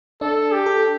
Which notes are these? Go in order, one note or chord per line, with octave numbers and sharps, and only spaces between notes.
D4 A4
G4
A4